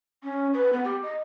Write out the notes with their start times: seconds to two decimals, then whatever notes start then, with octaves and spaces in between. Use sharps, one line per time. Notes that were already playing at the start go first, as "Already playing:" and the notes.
0.23 C#4
0.53 B4
0.73 B3
0.84 G4
1.03 D#5